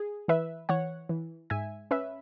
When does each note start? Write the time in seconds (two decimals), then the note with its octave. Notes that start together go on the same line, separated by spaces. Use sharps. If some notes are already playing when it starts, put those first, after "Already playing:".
Already playing: G#4
0.28 E3 B4 E5
0.69 E3 C#5 F#5
1.09 E3
1.50 G#2 E5 G#5
1.91 C#4 B4 E5